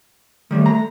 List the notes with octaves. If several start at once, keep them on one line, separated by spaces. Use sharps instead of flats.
D#3 G3 A3
A#5